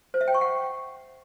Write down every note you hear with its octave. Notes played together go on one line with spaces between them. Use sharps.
C5
E5
G5
C#6
F#5